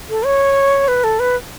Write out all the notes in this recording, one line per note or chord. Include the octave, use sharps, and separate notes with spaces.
A4
C#5
B4
A4
B4